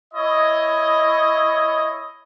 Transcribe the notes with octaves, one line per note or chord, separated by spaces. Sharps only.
E4 C#5 D#5